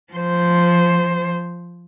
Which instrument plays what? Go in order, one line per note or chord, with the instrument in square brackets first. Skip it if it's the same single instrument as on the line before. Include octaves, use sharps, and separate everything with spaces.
[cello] F3 C5